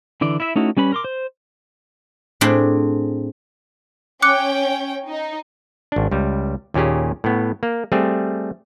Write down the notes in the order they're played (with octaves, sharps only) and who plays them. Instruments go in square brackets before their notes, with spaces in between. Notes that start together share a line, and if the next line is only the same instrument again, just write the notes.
[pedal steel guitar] D3 E3 D5
E4 E5
A3 C#4 D#4 E4 F#4
G3 C#4 B4 B5
A#4 C6 D6
C5
[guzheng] A2 A3 C4 D4 G#4 B5
[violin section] C#4 C#5 G5 [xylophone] D6 F#6 C#7
[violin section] D#4
[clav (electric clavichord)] G#1 D4
C#2 G3
D#2 A#2 C#4 G4 G#4
A2 B3
A#3
G3 A3 C4 G#4